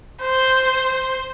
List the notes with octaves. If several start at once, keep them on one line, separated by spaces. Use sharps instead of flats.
C5